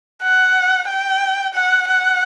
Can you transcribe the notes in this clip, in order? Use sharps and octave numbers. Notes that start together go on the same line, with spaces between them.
F#5
G5
F#5
F#5